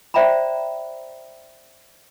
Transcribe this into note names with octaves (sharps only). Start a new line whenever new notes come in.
C5 D5 E5 G5 A#5 B5